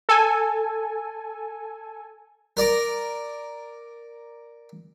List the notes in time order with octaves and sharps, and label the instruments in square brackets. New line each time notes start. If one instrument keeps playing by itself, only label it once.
[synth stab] A4 G#5
[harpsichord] A#4 D5 A#5